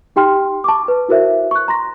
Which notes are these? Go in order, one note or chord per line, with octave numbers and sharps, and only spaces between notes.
D#4 G4 G5 C6 F6
A5 C#6 D6
B4
E4 F#4 A#4 C5 E5
C#6 F#6
A#5 C6 A#6